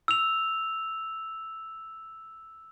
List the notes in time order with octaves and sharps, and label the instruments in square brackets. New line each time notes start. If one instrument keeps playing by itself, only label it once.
[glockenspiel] E6 F7